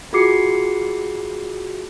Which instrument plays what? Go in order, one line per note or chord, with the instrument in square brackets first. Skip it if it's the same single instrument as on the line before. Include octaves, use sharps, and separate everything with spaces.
[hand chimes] F4 F#4 G#4 D6 C7 C#7